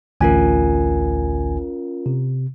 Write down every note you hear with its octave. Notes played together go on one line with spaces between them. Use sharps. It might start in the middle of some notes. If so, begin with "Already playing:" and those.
A1 D2 C#4 F4 A#4 G#5
C3